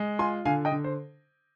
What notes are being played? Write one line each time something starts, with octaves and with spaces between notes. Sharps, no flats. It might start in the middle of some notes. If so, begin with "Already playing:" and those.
Already playing: G#3
F4 G#5 C6
D3 F5 G#5
D#5 G5
D3
C5